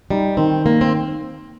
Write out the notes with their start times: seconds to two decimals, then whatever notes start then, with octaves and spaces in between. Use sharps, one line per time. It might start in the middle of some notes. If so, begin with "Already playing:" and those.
0.10 G3 D#4
0.37 D#3 C4
0.65 D#3 A#3
0.81 C4